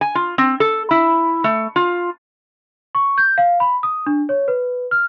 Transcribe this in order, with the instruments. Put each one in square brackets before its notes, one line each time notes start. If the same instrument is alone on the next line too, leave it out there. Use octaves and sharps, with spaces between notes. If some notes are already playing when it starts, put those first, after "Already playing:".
[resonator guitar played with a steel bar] G#5
F4
C4
A4
E4
A3
F4
[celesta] C#6
G6
F5
B5
D#6
D4
C#5
B4
F6